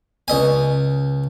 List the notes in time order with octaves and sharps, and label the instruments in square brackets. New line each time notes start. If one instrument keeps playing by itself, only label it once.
[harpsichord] C#2 D#5 G#5